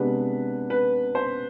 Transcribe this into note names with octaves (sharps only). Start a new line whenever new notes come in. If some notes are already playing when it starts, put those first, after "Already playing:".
Already playing: C3 G#3 B3 D4 B4
B4
C5